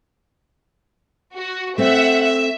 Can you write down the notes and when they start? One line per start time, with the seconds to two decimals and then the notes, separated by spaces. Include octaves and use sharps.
1.36 F#4
1.78 A3 C4 E5 F#5
2.23 E5